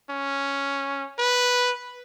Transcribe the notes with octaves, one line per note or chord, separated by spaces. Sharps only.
C#4
B4